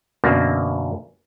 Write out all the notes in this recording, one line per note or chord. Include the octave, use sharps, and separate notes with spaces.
F#2 B2 D3 A#3